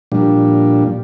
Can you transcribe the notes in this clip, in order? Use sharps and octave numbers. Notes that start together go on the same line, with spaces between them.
A#2 F3 G3 D4